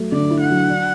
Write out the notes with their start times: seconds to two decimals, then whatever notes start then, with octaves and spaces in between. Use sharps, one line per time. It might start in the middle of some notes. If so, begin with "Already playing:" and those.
Already playing: F#3 A3
0.12 D3 D5
0.30 E4
0.40 F#5
0.50 F#3
0.69 D4